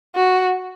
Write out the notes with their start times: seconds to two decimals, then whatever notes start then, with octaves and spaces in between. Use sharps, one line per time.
0.15 F#4